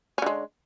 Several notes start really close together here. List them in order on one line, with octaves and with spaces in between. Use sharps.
C#4 D3 G#3